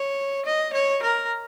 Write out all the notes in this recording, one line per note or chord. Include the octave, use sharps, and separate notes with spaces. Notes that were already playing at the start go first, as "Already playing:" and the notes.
Already playing: C#5
D#5
C#5
A#4